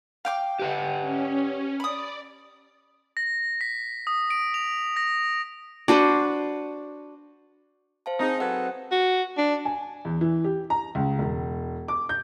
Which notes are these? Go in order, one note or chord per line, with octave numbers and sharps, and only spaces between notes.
F5 G5 D6
G4 B4 F#5
C#4
D5 B5 D#6
A#6
B6
D#6
D7
F7
A#6
D4 F#4 B4 C5
C5 F5 A5
C4 D#4 G#4
F#3 A4 B4 F#5
F#4
D4
G#5
E2
E3
G4
A#5
C#2
E1
D6
G6